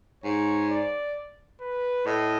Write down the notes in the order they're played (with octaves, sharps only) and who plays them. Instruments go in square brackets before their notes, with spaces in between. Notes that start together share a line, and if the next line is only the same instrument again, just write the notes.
[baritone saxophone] G#2 [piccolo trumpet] C#5
[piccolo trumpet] D5
B4
[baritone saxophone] A2 [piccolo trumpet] D#5